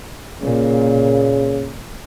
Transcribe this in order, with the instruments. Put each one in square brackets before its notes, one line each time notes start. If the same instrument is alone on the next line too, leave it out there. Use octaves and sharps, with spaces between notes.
[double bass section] A#2 [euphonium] C#3